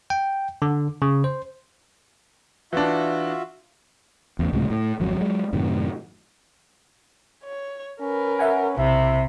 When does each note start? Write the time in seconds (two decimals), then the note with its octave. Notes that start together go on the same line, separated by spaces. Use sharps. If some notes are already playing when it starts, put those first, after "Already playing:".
0.10 G5
0.62 D3
1.02 C#3
1.24 C5
2.73 E3 D4 F4 F#4 E5
4.39 A1 E2
4.53 C#2 A2 C3 G3
4.70 A2
5.00 G#1 F2 F#3
5.17 F#3 G#3
5.53 F#2 A2 C3 D#3
7.44 C#5
8.01 C#4 A#4 B4
8.39 E5 F#5 G#5
8.78 B1 C3 E4 E5